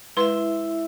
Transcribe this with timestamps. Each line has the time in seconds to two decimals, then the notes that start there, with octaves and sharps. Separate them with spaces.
0.17 G#3 E4 B4 E5 C6